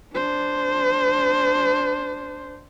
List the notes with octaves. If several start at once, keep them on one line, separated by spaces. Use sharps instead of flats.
D4 C5